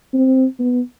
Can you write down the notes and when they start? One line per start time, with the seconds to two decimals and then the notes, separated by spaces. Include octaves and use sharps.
0.14 C4
0.59 B3